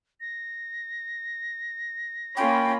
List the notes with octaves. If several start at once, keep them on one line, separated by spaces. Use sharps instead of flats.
A#6
A#3 C#4 F4 G5 B5